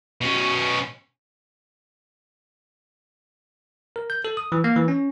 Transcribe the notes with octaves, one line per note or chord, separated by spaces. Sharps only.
B2 C#4
A#4
G6
A4
D#6
E3
A#3
E3
C#4